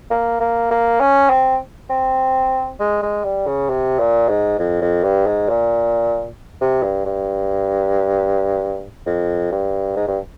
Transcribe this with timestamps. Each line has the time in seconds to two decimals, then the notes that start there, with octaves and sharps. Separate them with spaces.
0.10 A#3
0.40 A#3
0.71 A#3
1.00 C#4
1.30 C4
1.90 C4
2.79 G#3
3.02 G#3
3.24 G3
3.47 C#3
3.69 C3
3.99 A#2
4.29 G#2
4.59 F2
4.82 F2
5.03 G2
5.26 G#2
5.49 A#2
6.61 C3
6.83 G2
7.05 G2
9.07 F2
9.52 G2
9.96 G#2
10.08 G2